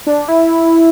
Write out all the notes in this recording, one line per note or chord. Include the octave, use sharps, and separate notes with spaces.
D4
E4